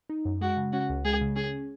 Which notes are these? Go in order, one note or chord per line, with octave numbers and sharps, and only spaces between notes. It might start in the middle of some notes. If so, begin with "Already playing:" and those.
D#4
F#2
G#3 F#4
C#3
C#4 F#4
C#2
G#3 G#4
C#3
C#4 G#4